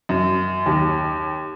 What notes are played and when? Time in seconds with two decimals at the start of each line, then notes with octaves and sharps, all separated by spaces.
0.09 F#2
0.66 D#2